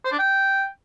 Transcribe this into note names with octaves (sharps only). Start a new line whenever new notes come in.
C5
D4
G5